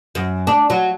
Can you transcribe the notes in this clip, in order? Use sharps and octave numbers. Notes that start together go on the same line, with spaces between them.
F#2
D4
F#3